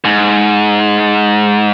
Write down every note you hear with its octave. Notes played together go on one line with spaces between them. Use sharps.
G#2